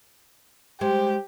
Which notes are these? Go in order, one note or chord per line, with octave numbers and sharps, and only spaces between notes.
G#3 G4 C5